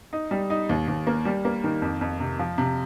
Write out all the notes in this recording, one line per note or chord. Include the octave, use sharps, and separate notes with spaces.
D#4
G3
D#4
D#2
D#2
A#3
G3
A#3
D#3
F2
F2
C3
F3
C3